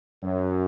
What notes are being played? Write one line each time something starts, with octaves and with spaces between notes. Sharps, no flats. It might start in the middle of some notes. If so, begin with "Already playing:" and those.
F#2